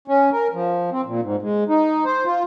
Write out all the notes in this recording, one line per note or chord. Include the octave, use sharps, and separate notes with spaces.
C#4
A#4
F3
C4
A#2
G#2
G#3
D#4
C5
F4